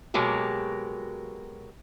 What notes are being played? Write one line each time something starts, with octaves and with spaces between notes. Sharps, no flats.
B2 F#3 G#3 A#3 G4